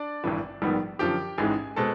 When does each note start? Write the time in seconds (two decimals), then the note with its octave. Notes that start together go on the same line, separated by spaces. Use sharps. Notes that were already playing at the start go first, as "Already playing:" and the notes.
Already playing: D4 D5
0.24 G#1 G2 E3
0.62 A#1 G#2 D#3 G3 B3
0.99 F#2 D3 F3 G4 G5
1.38 A1 G#2 E3 G#3 G#4 G#5
1.76 B2 G#3 C4 A4 A5